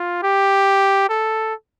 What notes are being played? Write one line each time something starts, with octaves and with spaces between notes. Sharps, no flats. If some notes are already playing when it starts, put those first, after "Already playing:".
Already playing: F4
G4
A4